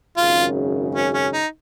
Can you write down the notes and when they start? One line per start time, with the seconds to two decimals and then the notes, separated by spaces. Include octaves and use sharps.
0.17 G#1 F#2 C#3 F4
0.95 C#4
1.14 C#4
1.33 D#4